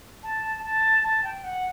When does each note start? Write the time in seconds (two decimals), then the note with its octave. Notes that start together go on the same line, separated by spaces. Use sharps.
0.23 A5
0.63 A5
1.04 A5
1.24 G5
1.44 F#5